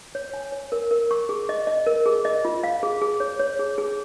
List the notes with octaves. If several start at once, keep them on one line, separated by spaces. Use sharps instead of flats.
C#5
G#5
C#5
A#4
A#4
C#6
G#4
D#5
D#5
A#4
G#4
D#5
F4
F5
G#4
G#4
C#5
C#5
G#4
G#4